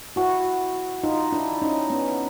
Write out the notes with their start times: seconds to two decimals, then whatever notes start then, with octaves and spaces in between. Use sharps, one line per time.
0.16 E4 F#4
1.03 D#4 F4
1.33 D4 E4
1.62 C#4 D#4
1.90 B3 C#4